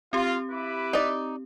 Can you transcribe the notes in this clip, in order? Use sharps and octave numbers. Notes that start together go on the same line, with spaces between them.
C4 F4 G4
E4 B4 D6
D#4 D5